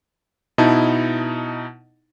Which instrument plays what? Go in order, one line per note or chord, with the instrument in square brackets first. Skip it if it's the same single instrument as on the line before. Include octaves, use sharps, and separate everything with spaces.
[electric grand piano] B2 D#4 E4 A5